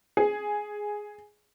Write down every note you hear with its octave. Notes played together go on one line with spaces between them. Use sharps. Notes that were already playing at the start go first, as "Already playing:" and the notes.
G#4